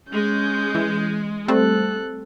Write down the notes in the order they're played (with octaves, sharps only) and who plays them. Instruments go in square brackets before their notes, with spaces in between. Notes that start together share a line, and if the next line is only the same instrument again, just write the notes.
[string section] G#3 [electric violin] C#4 G6
[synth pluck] E3
[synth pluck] G3 A3 C4 [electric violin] A4 F#6